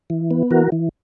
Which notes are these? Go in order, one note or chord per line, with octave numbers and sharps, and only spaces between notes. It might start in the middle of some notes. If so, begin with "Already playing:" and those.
E3
B3
E3 F#4 A#4
E3